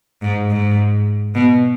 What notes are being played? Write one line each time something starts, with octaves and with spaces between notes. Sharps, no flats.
G#2
G#2
B2